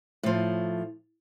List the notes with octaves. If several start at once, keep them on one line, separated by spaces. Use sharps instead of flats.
A2 F3